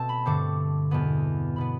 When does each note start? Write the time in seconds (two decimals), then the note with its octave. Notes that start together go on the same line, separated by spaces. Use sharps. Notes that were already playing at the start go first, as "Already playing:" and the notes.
Already playing: B2 A3 C4 A5 E6
0.09 B5
0.25 G2 D3 A3 C4 D6
0.91 E2 B2 B3
1.56 B2 B3 B5